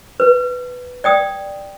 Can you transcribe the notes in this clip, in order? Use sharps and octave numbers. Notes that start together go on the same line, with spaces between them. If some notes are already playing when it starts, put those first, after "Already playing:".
B4
D5 G5 D#6